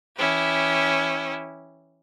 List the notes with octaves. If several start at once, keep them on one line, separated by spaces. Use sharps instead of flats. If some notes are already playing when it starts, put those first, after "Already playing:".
E3 C#4 E4 G4